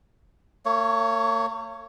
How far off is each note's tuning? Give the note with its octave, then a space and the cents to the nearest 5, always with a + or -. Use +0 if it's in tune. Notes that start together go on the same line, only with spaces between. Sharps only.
A#3 -45 C#5 +0